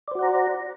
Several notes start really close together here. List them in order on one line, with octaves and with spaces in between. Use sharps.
D5 C5 F#4 F#5 A#5